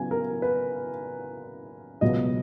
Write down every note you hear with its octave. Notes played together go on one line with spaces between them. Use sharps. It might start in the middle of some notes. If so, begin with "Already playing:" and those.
Already playing: C#3 F#3 B3 G#5
A#4
B4
C#2 B2 F#3 B3 D#5